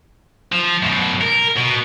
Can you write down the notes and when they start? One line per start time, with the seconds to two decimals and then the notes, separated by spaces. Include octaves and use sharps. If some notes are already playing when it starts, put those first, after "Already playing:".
0.53 F3
0.83 F#2 B2
1.22 A#4
1.57 B2